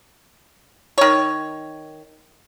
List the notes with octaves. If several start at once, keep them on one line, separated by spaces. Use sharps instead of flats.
D#3 C#5